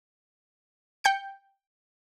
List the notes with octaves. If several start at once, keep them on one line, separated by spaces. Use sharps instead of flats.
G5 G6 C#7